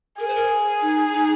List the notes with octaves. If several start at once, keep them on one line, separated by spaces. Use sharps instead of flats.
G#4 A#4
C5
A#4
D#4
D#4